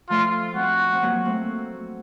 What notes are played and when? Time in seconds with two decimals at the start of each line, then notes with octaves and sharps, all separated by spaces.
0.10 F3 A3 F4
0.56 A3 C4 F#4
0.93 C4
1.02 F#3 A#3
1.25 A3 C4